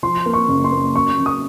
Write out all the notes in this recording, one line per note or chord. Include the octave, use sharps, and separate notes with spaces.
F3 C6
A#3
C#6
F#1
C6
A#3
F#2 C#6
F#2
D#6